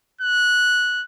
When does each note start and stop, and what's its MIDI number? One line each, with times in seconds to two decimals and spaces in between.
0.21 1.04 90